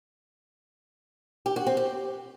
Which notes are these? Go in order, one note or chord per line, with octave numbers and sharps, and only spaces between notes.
G4
F#4
C4
G4